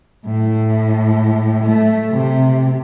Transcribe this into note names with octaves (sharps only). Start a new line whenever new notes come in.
A2
A3
C3